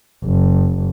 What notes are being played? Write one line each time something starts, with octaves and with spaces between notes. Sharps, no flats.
F#1